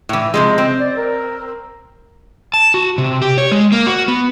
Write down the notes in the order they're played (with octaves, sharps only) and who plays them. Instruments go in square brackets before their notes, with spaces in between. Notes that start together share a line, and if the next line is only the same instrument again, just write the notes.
[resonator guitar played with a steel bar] A2 E3
[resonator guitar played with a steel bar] C3 F3 G#3 [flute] D#5
[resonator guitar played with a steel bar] C4
[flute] D5
A#4
[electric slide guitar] A5
F#4
C3
G4
C#5
G#3
A#3
F#4
B3